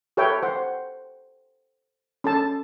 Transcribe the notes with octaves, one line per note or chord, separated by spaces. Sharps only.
G4 A4 B4 C#5 E5 G5
C5 F#5
C#4 A4 A5